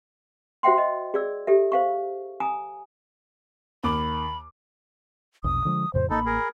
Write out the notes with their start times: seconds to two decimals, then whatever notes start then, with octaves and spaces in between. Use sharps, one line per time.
0.63 F#4 C5 E5 F#5 G5 C6
0.78 D#5
1.14 G#4 D5 E6
1.47 G4 A4 E5
1.72 C5 F5 C#6
2.40 G#5 A#5 D#6
3.84 D#2 A#3 B5 D6
5.44 A#1 E2 B2 D#6
5.65 D3 F3 G#3
5.94 F2 A2 C#3 C5
6.10 A1 A#3 D#4 A4 B5
6.26 G#4 A#4